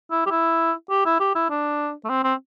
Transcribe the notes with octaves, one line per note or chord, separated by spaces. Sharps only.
E4
G4
E4
G4
E4
G4
E4
D4
A3
C4
C4